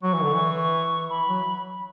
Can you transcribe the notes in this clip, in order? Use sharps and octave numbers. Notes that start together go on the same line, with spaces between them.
F#3 C#6
E3
D3
E3
C#6
E3 B5
F#3